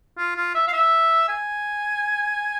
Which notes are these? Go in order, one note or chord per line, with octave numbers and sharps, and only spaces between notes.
F4
F4
E5
F5
E5
G#5